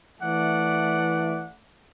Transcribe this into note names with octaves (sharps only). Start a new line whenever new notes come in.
E3 A3 D5 F#5